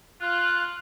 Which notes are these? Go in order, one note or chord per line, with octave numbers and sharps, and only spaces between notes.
F4 F#6